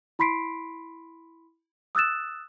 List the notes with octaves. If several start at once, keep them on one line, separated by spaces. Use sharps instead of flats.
E4 B5 C6 B6 C7 D7
D#6 E6 F#6 A6 E7